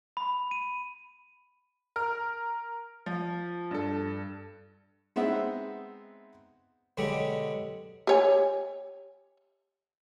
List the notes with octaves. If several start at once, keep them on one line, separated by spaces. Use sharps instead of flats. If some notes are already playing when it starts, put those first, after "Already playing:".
B5
D#7
A#4 F6
F3
G2 A4
G#3 B3 C4 D#4 E5 F#5
B2 D3 F#3 G#3 G4
G4 C#5 G#5